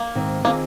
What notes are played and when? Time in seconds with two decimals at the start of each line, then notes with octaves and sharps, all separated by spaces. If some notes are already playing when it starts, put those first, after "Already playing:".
Already playing: A#3
0.15 G#2 D#3 C4
0.45 D#3 A#3 C4 F4 G#4